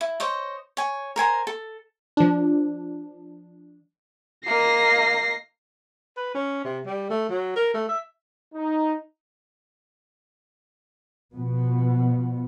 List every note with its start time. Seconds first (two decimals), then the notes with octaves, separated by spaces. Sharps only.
0.01 E4
0.20 C5 C#5 D#5
0.77 C#5 G#5
1.16 A#4 C5 G#5 A#5
1.47 A4
2.17 F3 D4
4.46 A#3 D#5 A#6 C7
6.17 B4
6.35 C#4
6.65 C3
6.86 G3
7.10 A3
7.30 F#3
7.56 A#4
7.74 A3
7.89 E5
8.54 D#4
11.34 B2 F3 B3